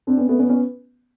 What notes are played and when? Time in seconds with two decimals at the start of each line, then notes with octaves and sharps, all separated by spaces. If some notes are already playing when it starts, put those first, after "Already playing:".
0.07 C4 D4
0.17 B3 C#4
0.29 A3 B3
0.39 B3 C#4
0.49 B3 C#4